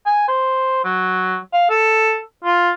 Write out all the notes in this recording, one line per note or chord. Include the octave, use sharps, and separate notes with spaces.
G#5
C5
F#3
F5
A4
F4